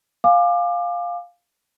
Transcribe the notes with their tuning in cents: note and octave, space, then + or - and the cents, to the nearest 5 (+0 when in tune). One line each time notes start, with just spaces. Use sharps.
F5 +10 G#5 +0 D6 +25